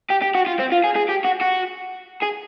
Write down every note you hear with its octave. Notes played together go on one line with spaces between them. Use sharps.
G4
G4
F#4
F4
C4
F4
G#4
G#4
G4
F#4
F#4
G#4